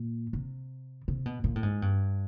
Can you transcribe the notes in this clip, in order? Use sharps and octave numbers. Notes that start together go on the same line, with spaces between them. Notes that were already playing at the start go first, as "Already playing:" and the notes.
Already playing: A#2
C3
C3
B2
A#2
A2
G#2
G2